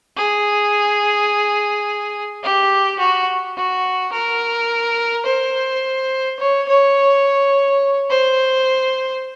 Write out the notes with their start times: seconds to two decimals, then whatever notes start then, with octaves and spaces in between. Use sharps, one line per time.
0.16 G#4
2.43 G4
2.99 F#4
3.57 F#4
4.13 A#4
5.26 C5
6.39 C#5
6.69 C#5
8.10 C5